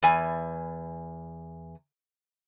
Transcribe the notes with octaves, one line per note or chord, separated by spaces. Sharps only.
E2 G#5